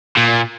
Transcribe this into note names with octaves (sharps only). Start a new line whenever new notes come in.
A#2